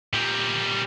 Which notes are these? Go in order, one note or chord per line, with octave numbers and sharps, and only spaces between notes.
A#2 G3